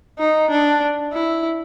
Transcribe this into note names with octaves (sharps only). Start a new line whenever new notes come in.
D#4
D4
E4